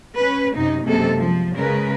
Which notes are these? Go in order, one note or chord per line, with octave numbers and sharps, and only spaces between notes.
C#4 B4
F#2 C3 D#4
F#2 C3 G#3 A#3 A4
F3
C#3 G#3 A#4 B4